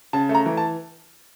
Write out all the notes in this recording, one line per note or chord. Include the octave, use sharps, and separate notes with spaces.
C#3 A5
A3
A#5
E3
A5